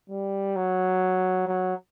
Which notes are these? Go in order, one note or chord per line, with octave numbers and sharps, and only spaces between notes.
G3
F#3
F#3